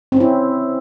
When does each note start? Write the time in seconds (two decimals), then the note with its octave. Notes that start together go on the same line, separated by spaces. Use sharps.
0.12 C4
0.16 C#4
0.20 E4